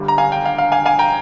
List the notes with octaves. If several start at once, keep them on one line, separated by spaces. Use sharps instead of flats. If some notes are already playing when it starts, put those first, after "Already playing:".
Already playing: G1 G2 G3
A#5
F5 G#5
G5
F5
F5
F5 G#5
F5 G#5
G5 A#5